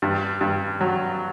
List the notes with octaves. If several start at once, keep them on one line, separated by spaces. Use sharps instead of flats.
G2
G2
F#3